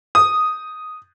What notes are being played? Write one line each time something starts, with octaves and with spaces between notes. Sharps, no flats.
D#6